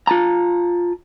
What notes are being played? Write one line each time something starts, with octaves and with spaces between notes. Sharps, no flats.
F4 A5 A#5